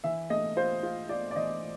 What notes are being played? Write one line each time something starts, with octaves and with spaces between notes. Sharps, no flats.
E3 E5
A3 D#5
F4 C5
F4
F4 D5
D5
E3 D#5